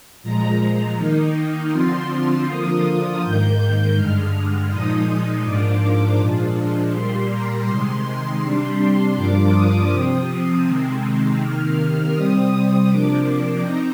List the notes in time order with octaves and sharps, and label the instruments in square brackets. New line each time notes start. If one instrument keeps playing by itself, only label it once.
[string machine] A#2 F3 G#3 A#5
D#3 A#3 D#4
D3 F3 C4 F4 C6
D3 F3 A#3 F4 D#6
G#2 D#3 A#3 G6
G2 D3 G#3 F6
A#2 F3 G#3 D#4 D#6
G#2 F3 A#3 D4 F4 D6
A#2 F3 G#3 D4 F4
A#2 G3 A#3 C6
A#5
C3 D#3 G#3 C6
C3 G3 D4 C6
G2 F3 A#3 D4 F4 D6
D#6
C3 F3 C4
C3 D#3 G#3 C4
C3 D#3 A#3 F6
C3 G3 C4 D#6
C3 F3 A#3 D4 D6
C4 D#4 A#5